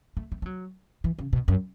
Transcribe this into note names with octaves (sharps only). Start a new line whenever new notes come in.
A3
A3
A3
F#3
E3
C#3
B2
F#2